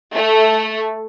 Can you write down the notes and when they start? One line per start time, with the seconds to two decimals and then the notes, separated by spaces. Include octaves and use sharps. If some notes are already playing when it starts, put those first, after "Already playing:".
0.14 A3